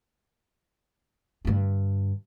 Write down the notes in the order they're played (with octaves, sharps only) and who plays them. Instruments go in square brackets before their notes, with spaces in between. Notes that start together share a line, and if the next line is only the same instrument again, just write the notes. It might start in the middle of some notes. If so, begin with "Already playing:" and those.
[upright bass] G2 D3